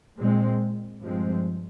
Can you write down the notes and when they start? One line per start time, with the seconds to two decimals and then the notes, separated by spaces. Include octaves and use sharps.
0.17 A#2 G#3 C4
1.02 G2 F3 G#3 C4